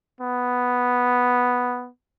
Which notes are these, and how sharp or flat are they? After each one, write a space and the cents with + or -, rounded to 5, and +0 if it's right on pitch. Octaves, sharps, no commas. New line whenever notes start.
B3 +0